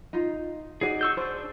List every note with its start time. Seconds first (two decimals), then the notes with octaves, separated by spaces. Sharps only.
0.13 D#4 F4
0.81 D#4 F#4 G#4 D5
1.01 C#6 E6 G6
1.17 D4 G#4 C5